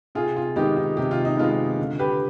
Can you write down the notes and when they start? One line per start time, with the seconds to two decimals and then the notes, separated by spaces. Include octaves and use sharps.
0.15 C3 F4 G#4
0.36 F4
0.56 D#3 G#3 B3 D#4 G4
0.77 D#4
0.97 C3 G4
1.11 F4
1.25 D#4
1.37 D#3 G#3 B3 F4
1.79 D3
1.99 G4 B4